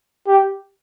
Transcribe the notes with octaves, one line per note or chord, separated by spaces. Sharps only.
G4